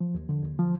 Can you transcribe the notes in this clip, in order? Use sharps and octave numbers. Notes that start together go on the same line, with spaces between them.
F3
D#2
D3
D#2
F3